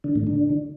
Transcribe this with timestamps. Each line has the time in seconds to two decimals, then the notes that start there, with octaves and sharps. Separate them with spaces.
0.04 D3
0.15 A2
0.27 D3